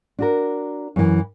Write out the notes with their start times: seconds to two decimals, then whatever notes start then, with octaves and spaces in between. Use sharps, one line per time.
0.19 D4 F#4 A#4
0.96 F#2 E3